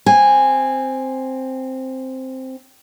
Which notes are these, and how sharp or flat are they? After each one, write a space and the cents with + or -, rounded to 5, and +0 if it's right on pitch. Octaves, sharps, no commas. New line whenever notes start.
C4 +0 G#5 -10